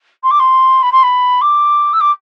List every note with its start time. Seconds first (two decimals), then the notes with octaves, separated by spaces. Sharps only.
0.23 C6
0.30 D6
0.39 C6
0.82 B5
0.92 C6
1.03 B5
1.41 D6
1.93 E6
2.00 D6